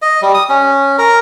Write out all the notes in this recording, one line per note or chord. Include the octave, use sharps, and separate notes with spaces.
D#5
G3
D#6
C#4
A#4